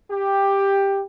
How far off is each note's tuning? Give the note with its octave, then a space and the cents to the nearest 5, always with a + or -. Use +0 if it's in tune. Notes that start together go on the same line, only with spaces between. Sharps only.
G4 +10